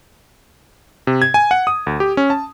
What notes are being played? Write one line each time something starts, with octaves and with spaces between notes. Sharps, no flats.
C3
G#6
G#5
F#5
D#6
D2
G4
C#4
A5